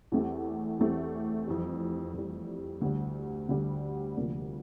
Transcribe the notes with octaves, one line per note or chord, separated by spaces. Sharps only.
E2 E3 A3 C4 G4
E2 E3 A3 C4 G4
F2 E3 G3
F2 E3 G3
D2 D3 G3
D2 D3 G3
D2 C3 F3 A#3 D4